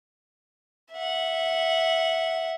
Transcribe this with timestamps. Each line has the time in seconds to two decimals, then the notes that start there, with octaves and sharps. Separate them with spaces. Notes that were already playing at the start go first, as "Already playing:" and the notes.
0.94 E5 F#5